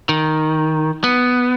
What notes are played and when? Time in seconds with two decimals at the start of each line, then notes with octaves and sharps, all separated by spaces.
0.09 D#3
1.04 B3